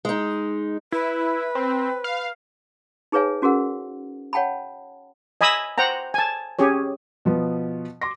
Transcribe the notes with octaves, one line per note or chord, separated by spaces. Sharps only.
G#3 D#4
E4 B4
C4
F5
D#4 G#4 B4 C#5 F5 G#5
C#4 F#4 G#4 A#4 F#5
C#5 F#5 G5 A5 B5
D#5 G#5 B5 D#6 E6
C5 F#5 G5 A#5
G#5 A5
C#4 G4 G#4 C#5
B2 F3 B3
C6 D6 A#6